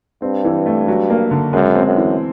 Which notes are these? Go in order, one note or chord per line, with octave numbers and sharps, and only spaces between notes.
G2 C4
E3
A3
F#3
A#3
D3
F#2 G#3
C4
F#2
E3